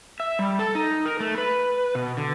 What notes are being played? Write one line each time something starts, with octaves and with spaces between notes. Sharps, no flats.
E5
G3
A4
D#4
A#4
A3
B4
B2
D3